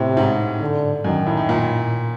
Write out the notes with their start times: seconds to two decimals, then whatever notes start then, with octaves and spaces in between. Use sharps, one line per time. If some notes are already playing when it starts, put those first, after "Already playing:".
Already playing: A2 C3
0.17 G#2
0.61 D3
1.05 F#2 D#3
1.26 A2
1.37 A2
1.49 A#2